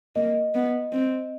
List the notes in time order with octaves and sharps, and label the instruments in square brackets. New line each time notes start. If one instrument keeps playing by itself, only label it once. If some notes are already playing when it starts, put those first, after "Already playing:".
[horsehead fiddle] A#3 [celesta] D#5
[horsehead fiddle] B3
C4